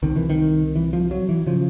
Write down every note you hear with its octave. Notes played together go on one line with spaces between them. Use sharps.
C2 C3 D#3
E3
D#3
E3
F3
F#3
E3
C#3 F3